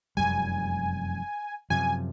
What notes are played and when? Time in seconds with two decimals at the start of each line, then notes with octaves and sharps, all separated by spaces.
0.17 F1 F#2 G3 G#5
1.70 F#2 C3 F3 G#5